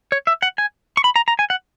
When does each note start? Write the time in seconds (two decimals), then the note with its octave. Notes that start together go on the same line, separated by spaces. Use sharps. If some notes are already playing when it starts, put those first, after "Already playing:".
0.12 C#5
0.27 E5
0.42 F#5
0.58 G#5
0.97 C#6
1.04 B5
1.16 A#5
1.28 A#5
1.39 G#5
1.50 F#5